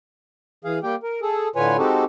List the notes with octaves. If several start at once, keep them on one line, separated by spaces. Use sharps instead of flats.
E3 G#4 F5
G3 A#3 G4 G5
A#4
G#4 A4
A2 D3 F4 B4 C#5 G#5
G#3 C4 D#4 F#4 G4 A4